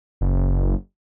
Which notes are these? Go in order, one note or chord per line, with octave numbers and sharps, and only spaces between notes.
F#1